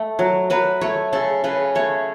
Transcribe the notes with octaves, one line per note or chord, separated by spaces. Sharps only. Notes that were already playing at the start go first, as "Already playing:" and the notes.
Already playing: A3
F#3
F#3 B4
A3 C#5
C#3 A4
C#3 B4
A3 C#5